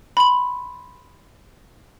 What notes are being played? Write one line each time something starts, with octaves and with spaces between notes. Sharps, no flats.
B5 C6 F#7